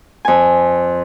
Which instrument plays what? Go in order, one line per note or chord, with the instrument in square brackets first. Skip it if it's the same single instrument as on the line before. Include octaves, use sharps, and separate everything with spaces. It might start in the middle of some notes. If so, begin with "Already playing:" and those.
[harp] F2 G#5